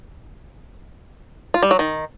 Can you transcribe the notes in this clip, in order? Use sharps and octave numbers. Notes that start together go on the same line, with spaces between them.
F4
G3
F#3
D#3